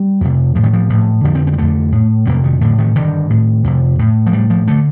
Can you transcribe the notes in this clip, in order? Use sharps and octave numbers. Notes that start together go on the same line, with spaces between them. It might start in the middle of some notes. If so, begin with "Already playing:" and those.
Already playing: G3
F2 C3
A2 F3
D#3
F3
A2
F2 D3 F3
C4
C4
G3
F2 D3 A3
A2
F2 C3 A#3
D#3
A2 D3
D#3
G2 D3 D#3
A2
F2 C3
A2
F3
A2 G3
F3
D3 A3